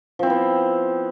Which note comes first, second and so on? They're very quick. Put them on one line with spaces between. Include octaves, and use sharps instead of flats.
F3 C4 E4 B3